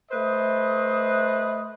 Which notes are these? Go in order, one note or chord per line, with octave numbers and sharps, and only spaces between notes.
A3 B4 C5 D#5